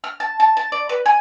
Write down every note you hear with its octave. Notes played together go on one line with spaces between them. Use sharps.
F6
A5
A5
A5
D5
B4
G#5